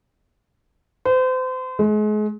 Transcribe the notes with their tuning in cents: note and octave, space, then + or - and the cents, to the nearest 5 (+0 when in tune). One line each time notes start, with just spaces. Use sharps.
C5 -35
G#3 +35